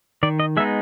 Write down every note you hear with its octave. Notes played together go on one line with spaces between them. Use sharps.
D#3 D5
D#5
G#3 B3 D#4 E5